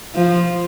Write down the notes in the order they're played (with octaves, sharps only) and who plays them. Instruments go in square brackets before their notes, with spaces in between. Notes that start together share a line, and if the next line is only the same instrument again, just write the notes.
[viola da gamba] F3